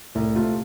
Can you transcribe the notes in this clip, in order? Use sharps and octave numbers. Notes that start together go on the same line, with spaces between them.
C2 A2
C3 A3 F4